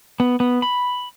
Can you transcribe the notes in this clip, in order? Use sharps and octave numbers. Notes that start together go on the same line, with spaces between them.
B3
B3
B5